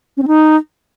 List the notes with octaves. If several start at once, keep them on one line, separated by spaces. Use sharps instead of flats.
C#4
C4
D#4